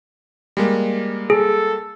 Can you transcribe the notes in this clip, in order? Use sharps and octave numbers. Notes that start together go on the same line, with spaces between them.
G3 G#3 A#3
G#4 A4